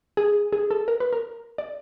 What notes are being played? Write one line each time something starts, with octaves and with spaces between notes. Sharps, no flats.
G#4
G#4
A4
A#4
B4
A#4
D5